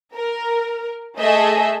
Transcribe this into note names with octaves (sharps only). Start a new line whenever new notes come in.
A#4
A3 G#4 A4 D#5 E5